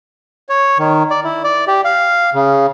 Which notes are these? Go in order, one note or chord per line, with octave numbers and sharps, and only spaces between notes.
C#5
D#3
D5
E4
D5
G4
F5
C#3